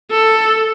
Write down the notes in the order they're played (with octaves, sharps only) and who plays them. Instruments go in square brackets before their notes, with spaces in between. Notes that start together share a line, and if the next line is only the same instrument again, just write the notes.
[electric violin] A4